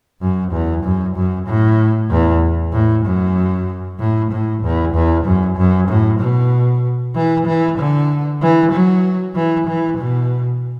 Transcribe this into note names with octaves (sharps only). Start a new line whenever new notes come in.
F#2
E2
F#2
F#2
A2
E2
A2
F#2
A2
A2
E2
E2
F#2
F#2
A2
B2
E3
E3
D3
E3
F#3
E3
E3
B2